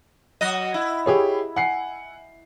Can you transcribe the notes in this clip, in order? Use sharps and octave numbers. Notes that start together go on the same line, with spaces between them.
F#3 F#4 D#5
E4
G4 G#4 C#5
F#5 G#5 C7